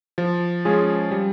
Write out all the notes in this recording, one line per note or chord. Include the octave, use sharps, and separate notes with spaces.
F3
G#3 C#4 F4 G#4
G3